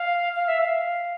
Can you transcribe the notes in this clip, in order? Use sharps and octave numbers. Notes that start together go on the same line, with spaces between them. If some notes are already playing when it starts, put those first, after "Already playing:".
Already playing: F5
F5
E5
F5